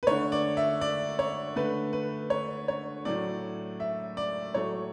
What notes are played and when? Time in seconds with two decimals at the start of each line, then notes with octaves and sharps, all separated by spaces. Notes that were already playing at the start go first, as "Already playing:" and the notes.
0.03 B4
0.07 D3 A3 C#5
0.32 D5
0.57 E5
0.81 D5
1.19 C#5
1.56 D3 A3 B4
1.93 B4
2.30 C#5
2.68 C#5
3.05 A2 F#3 A3 D5
3.80 E5
4.17 D5
4.54 A2 F#3 A3 C#5